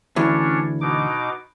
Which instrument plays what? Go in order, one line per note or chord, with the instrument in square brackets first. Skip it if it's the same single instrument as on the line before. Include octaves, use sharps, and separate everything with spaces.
[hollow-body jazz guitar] D2 E3 [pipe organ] C#4 D4 C#5
[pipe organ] B2 D#4 D6